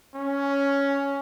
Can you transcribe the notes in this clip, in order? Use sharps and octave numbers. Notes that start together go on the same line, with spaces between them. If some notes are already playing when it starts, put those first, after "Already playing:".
C#4